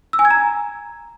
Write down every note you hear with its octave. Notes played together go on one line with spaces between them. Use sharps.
E6
G#5
G#6
A#5